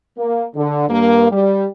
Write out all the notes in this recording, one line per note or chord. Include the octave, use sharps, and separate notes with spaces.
A#3
D3
G2 A#3
G3